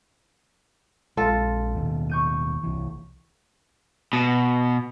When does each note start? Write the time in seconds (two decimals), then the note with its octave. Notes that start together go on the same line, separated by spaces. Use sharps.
1.17 A#1 G#3 F4 A4
1.76 D#2 B2 D#3
2.10 C#6 G6 D#7
2.63 C2 E3
4.13 B2